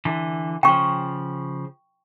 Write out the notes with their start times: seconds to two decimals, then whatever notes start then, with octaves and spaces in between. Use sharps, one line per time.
0.05 D3 E3
0.63 C#3 F3 G5 C#6